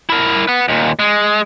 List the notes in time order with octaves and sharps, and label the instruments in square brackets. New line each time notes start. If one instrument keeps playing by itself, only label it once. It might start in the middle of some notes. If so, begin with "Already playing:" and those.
[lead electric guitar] E4 A#4
B4 F#5
D#2 A#2
G#3